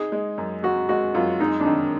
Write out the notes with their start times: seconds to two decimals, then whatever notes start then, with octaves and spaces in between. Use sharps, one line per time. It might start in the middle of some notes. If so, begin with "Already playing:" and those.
Already playing: D#4 G#4
0.12 G#3
0.38 F#2
0.63 G#3 F#4
0.89 G#3 F#4
1.14 F#2 F4
1.40 G#3 D#4
1.60 D4
1.65 D#3 D#4